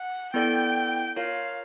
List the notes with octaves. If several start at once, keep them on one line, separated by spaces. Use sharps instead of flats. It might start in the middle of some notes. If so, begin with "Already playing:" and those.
Already playing: F#5
B3 E4 A4 D5 G5
F4 A#4 C#5 F5